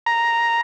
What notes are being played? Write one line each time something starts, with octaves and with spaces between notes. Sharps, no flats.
A#5